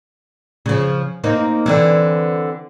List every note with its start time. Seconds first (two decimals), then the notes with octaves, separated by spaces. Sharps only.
0.66 C#3 F3
1.24 A#3 C4 D#4
1.66 D3 E3 C4